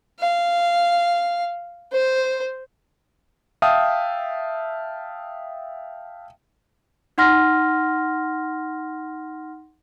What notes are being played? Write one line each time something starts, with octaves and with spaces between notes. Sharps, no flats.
F5
C5
E5 F5 G5 A5 D#6
D#4 F#5 C6 F6 A#6